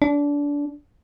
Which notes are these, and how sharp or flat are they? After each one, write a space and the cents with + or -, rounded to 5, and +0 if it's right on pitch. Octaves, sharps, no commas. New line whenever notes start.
D4 -25